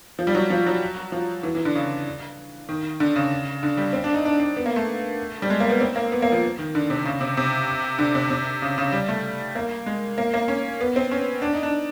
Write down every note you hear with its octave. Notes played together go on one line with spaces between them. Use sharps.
F3
G3
F#3
F3
F#3
F3
E3
E3
D3
C#3
D#3
D3
C#3
D3
G3
C4
D4
D#4
D4
D4
B3
A#3
A3
G3
G#3
A#3
B3
C4
A#3
B3
A#3
F3
D#3
D3
C3
C#3
C3
C3
D3
C3
C3
C#3
C#3
G3
A3
A#3
G#3
A#3
A#3
C#4
B3
C4
C#4
D4
D#4
D4